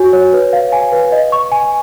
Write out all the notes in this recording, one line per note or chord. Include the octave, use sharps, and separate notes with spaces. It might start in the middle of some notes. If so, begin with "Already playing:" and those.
Already playing: F#4 C#5 G#5
C#5
B4
F5
G#5
B4
D#5
C#6
G#5